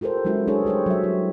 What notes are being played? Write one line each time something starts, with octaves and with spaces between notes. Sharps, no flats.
F4 G4 A4 A#4 C5
F#3 G#3 C#4 E4 F#4
D4 G#4 A4 B4 C#5
G3 G4 C5 C#5
F#3 E5
E4